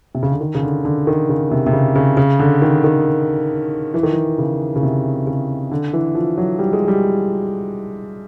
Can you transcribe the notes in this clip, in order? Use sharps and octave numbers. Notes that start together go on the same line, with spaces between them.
C3
C#3
D3
D#3
C#3
D3
D3
D#3
C#3
C3
C3
C#3
C#3
C#3
D3
D#3
D#3
E3
D#3
E3
C#3
C#3
C3
C#3
D3
E3
F3
F#3
G3
G#3
G3